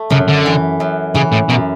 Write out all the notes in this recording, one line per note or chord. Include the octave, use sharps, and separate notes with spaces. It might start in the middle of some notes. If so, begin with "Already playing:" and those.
Already playing: A3
F#2 C#3
D3
E3
F#2
C#3 E3
A2
F#2 B2